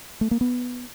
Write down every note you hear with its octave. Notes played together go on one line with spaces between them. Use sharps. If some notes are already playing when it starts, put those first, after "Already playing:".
A3
A#3
B3